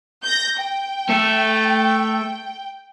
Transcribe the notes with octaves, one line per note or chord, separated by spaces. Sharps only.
G6 A#6
G5
A3 A4